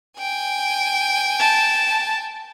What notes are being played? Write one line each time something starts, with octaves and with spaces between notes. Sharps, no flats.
G5 G#5
A5